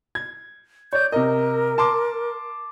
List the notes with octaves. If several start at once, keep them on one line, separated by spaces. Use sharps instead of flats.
G#6
C#5 D5 G6
C3 A#4 D#5
A5 C6 D6